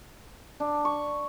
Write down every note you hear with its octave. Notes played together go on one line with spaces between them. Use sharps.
D4
C#6